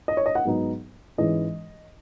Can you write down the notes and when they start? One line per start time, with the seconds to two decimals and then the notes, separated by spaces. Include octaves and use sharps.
0.08 D#5
0.17 C#5
0.26 D#5
0.35 F#5
0.45 G#2 F#3 B3 D#4
1.18 G#2 E3 G#3 C#4 D#5